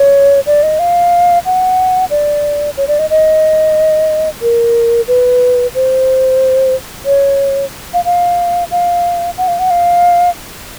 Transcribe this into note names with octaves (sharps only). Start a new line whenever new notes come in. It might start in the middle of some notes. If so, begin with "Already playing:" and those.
Already playing: C#5
D5
D#5
F5
F#5
D5
C#5
D5
D#5
D#5
A#4
B4
C5
C#5
F5
F5
F5
F#5
F5
F#5
F5